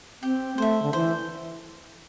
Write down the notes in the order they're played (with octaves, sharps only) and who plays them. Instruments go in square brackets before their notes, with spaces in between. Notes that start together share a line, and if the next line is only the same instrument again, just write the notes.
[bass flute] C4 [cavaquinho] G4
[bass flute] A3 [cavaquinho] C5 E5
[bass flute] D3
[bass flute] E3 [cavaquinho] C5